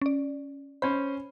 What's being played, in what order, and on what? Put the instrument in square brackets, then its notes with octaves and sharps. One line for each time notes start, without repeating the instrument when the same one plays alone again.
[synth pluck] C#4 D5
[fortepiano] C#4 C5 [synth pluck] B5